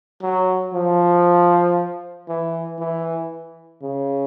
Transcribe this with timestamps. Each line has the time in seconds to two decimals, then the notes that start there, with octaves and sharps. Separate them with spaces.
0.22 F#3
0.74 F3
2.28 E3
2.79 E3
3.82 C#3